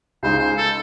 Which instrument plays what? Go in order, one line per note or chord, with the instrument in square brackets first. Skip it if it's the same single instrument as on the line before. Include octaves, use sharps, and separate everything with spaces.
[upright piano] C#2 C#3 G#3 D#4 [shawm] C5
[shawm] C5
A4